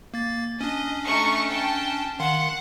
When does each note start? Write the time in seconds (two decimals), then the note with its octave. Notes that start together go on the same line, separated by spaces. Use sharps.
0.14 A#3 A6
0.61 C#4 D4 D#5
1.04 A3 D#4 C#6
1.48 G5 A5
2.20 D#3 F5 F#5 C6